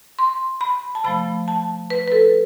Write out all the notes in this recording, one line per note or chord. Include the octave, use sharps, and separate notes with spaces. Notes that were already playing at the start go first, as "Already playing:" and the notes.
C6
B5
A5
C3 F3 A3 B5
A5
B4
B4
A4